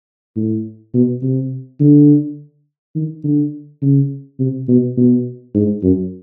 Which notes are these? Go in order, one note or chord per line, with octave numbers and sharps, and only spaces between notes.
A2
B2
C3
D3
D#3
D3
C#3
C3
B2
B2
G#2
F#2